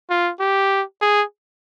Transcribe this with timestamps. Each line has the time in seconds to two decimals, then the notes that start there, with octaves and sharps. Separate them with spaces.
0.10 F4
0.40 G4
1.02 G#4